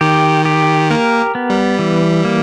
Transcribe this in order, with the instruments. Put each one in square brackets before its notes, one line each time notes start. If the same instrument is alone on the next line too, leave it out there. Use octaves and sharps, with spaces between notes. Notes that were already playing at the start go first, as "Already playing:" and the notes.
[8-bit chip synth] D#3 [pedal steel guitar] G4
[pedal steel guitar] G4
[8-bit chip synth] A#3 [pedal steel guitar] A#4
[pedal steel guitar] B3
[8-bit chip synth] G3
[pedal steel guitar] E3
A#3